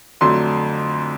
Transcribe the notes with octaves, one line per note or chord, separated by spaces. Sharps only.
F2 D3 F#3 A3 C6